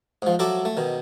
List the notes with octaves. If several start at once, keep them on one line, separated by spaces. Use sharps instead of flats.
G#2 F3
F#3 F#4 A4 E5 D6
A3
B2 D#3